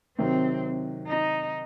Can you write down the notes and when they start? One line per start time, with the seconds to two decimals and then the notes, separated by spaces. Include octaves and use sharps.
0.18 C3 D#3 F#3 C4
1.08 D#4